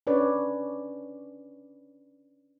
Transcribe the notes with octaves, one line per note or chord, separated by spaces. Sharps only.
C#4 D4 B4 C#5 D5